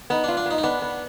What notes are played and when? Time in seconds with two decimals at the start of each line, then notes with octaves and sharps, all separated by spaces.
0.10 B3 D#4
0.24 D4
0.28 F4
0.37 D4
0.46 B3 D#4
0.58 D#4
0.63 B3 D4
0.82 B3